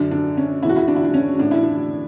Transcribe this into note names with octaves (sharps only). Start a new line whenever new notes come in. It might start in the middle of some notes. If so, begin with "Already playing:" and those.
Already playing: F#2 D3 D4
D4
C#4
E2 B2 E4 F#4
E4
D4
E4
D4
C#4
A2 E3 D4
E4
D4